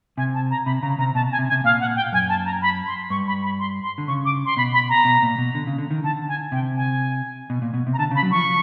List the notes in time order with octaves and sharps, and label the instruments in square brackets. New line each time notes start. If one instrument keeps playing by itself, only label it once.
[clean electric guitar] C3 [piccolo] G#5
[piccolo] A5
A#5
[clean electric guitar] C3 [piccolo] B5
[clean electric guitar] C#3 [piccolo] A#5
[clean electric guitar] C3 [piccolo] A#5
[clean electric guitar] B2 [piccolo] A5
[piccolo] G#5
[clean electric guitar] C3
[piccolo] G#5
[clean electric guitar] C3
[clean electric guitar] A#2 [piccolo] F5
[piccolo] F#5
G5
[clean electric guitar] F#2 [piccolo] G#5
[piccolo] A5
A#5
B5
C6
[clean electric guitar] G2 [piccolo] C#6
[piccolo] B5
B5
C6
C6
[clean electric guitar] D3
[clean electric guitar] C#3 [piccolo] C#6
[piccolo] D6
C6
[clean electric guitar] B2 [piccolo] B5
[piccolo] B5
A#5
[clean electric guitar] B2
A#2
B2
D3
C#3
D3
D#3
[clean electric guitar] D3 [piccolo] A5
[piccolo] G#5
[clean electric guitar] C3 [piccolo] G5
[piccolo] G#5
[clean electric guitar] B2
A#2
B2
C3
[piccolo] A#5
[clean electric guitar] D3 [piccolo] A5
[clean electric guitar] C#3
[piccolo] B5
[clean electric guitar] F#3
[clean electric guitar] F3 [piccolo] C#6